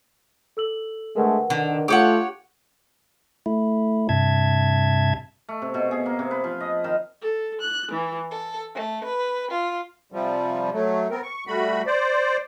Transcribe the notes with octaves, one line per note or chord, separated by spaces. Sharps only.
A4 E6 F#7
D3 G#3 A3 A#4 B4 F#5
D3 D#3
A3 F4 G4 C#5 F#5 D#6 G6
A3 E4
G2 C3 E5 A5 G#6
A3
C3
B2
G#4
A#3
C3
B4
F3
D#5
D#3
A4
F#6
E3
A4
A3
B4
F4
C3 F3 G3
F#3 A3
B3 C4 A#4
C#6
G3 A3 F#4 B5
C5 D5